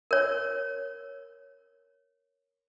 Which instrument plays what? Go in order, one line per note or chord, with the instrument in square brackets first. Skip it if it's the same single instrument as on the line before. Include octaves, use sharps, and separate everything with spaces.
[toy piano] A#4 C#5